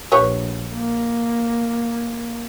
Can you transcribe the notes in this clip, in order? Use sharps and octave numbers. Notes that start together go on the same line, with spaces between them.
A#1 G4 B4 C#5
A#3